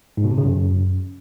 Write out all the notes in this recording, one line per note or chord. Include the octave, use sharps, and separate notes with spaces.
G#2
B2
C3
C#3
F#2